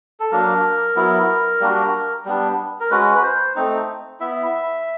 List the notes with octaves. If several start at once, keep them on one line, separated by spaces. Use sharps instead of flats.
A4
F#3 A#3 D4 A#4
F#3 B3 E4
G3 A#3 D4 F#4
G3 B3 D4
A#4
G#3 C#4 F#4 B4
B4
C5
A3 C4 D#4
B3 E4 E5